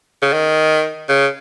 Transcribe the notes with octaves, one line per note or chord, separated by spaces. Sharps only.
C#3
D#3
C#3